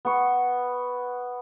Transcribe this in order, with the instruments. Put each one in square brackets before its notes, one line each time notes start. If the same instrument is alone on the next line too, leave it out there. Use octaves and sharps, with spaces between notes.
[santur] B3 C#6